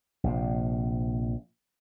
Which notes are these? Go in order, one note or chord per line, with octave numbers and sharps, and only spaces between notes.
A#1 C3